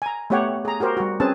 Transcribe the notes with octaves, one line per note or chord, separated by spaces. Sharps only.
G#5 A#5
A3 B3 G4 C#5 F#5 G5
G#4 A#5
F#4 G4 A#4 C5
G3 F#4
C4 C#4 G#4 B4 A5